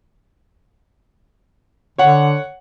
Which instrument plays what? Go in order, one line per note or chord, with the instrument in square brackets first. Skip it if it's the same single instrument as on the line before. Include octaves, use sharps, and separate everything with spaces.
[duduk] D3 [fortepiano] C#5 F#5